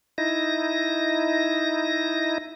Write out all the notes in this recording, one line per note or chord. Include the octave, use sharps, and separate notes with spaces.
D#4 E4 A#6